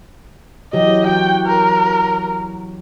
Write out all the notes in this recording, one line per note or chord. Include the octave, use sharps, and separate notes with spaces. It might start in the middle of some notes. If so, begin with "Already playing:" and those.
E3 F#3 G4 D#5
F#4 G5
A#4